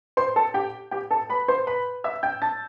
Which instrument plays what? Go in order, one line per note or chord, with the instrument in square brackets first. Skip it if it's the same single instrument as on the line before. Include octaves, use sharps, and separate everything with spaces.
[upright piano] C5 C6
A4 A5
G4 G5
G4 G5
A4 A5
B4 B5
C5 C6
B4 B5
E5 E6
G5 G6
A5 A6